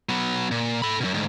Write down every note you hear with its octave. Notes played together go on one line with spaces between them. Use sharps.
F#3 B3
A#2
A4 B5
F#2 B2
D2 G#2